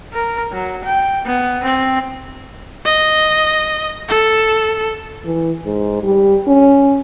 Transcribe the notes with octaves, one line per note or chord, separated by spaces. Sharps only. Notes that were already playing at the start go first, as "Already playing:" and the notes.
A#4
F#3
G5
B3
C4
D#5
A4
E3
G#2
G3
C#4